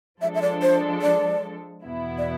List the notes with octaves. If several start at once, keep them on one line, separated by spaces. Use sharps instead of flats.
F3 G#3 D4 A4 E5
E5
D5
C5
D5
E2 B2 B3 E4
D5